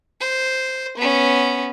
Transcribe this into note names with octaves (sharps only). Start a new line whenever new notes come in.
C5
B3 C#4